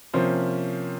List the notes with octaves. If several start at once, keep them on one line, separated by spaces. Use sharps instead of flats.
C3 F3 A#3 C#4 C5